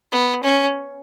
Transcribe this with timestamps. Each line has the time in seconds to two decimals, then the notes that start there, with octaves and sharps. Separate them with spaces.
0.12 B3
0.43 C#4